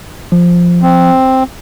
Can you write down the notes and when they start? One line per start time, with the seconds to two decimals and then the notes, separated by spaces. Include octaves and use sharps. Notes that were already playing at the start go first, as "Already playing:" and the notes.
0.32 F3
0.82 C4